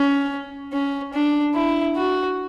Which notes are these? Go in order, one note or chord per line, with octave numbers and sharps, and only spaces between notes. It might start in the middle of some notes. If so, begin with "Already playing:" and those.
Already playing: C#4
C#4
D4
E4
F#4